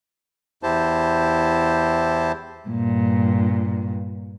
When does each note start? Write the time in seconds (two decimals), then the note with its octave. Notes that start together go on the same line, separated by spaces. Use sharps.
0.63 E2 E4 G4 C5 A5
2.68 G2 A#2